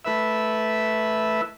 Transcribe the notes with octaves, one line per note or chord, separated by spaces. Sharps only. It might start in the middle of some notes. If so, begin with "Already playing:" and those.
A3 E4 B4 E5